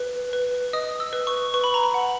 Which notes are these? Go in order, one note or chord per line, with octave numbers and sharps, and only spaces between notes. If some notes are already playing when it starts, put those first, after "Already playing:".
Already playing: B4
B4
D#5 D#6
E6
B4
C#6
B4 C#6
B5
A#5
B5
F#5